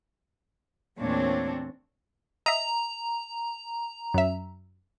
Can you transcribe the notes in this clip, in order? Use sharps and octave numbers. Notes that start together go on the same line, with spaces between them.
E2 A#2 A3 C4 D4 C#5
D#5 E5 A#5
F#2 E5